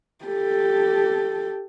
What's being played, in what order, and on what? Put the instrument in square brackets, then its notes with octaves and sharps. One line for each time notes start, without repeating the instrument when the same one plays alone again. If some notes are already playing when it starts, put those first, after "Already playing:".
[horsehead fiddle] G4 A4